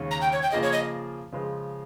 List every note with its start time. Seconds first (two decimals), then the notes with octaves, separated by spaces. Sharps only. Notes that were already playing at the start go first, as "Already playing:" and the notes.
Already playing: D#2 C#3 G#3 C#4
0.11 A#5
0.21 G5
0.32 C#5
0.42 G5
0.51 C#3 F3 A#3 F4 G#4 D#5
0.63 C#5
0.73 D#5
1.32 C#3 F3 G#3